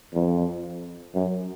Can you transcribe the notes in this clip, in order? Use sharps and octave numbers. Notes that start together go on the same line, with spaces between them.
F2
F#2